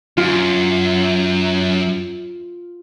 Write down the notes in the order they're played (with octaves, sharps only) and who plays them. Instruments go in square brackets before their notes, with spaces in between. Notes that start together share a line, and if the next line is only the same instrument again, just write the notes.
[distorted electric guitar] F#2 [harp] F4